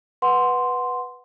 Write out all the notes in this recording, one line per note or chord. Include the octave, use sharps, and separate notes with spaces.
B4 F#5 C6